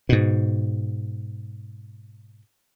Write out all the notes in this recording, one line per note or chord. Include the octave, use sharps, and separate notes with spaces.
G#2 B2